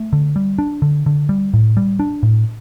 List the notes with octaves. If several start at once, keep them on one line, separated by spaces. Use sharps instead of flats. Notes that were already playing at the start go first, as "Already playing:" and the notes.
Already playing: A3
D3
G3
D4
D3
D3
G3
A2
G3
D4
A2